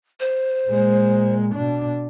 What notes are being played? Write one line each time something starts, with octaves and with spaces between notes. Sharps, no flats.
C5
A#2 G#3
B2 D4